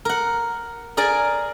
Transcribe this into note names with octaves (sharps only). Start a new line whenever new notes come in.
A#4 F#5
G#4 A#4 D5 G#5